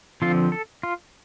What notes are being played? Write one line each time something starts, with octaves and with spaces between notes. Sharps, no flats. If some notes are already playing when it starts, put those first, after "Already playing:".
D3 F3 C4 F4
A4
F4